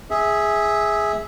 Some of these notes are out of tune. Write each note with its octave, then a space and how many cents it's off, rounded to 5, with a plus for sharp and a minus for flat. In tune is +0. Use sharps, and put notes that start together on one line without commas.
G#4 +0 E5 -15